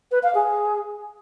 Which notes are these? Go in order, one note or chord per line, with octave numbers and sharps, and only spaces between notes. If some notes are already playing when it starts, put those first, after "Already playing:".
B4
F5
G#4